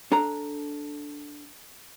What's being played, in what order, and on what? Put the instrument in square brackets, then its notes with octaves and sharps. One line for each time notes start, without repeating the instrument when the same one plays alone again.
[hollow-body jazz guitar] D4 A4 A#5